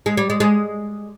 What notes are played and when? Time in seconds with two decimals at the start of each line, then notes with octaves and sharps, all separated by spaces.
0.06 G#3
0.17 G3
0.30 G#3
0.40 G#3